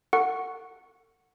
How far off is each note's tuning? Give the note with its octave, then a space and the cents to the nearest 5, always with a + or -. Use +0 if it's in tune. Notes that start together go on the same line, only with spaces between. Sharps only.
A4 +45 F#5 +0 C#6 +0